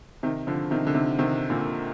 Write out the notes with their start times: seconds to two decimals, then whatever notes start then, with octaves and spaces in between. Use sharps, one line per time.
0.23 C3 D#3
0.47 D3 F3
0.71 C3 D#3
0.87 D3
0.95 C3 D#3
1.19 C3 D#3
1.50 A#2 D3